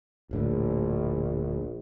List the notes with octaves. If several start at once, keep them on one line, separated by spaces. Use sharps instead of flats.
D1 A#1 A2 D3